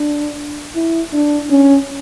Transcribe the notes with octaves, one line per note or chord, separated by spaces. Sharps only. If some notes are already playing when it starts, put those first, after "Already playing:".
Already playing: D4
E4
D4
C#4